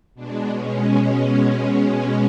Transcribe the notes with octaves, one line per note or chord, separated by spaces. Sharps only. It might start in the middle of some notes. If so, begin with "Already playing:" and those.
B2 G#3 D4
B2 G#3 C#4
B2 G#3 C#4